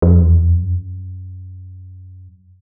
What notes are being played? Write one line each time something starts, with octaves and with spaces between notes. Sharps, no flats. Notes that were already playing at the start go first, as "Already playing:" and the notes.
F2
E2
F2
F#2